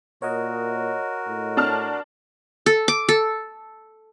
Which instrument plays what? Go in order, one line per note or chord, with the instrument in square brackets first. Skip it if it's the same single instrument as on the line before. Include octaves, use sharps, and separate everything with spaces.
[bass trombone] A#2 [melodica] F#4 A#4 [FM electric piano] C#5 D#5
[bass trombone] A2
[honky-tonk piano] D4 A5 F6
[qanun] A4
D6
A4